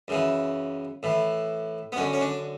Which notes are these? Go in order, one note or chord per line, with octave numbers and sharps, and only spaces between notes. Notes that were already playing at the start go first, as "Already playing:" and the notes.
F#2 C#3 E3
A2 E3
B3
F#2 D3 C#4
C#4
D4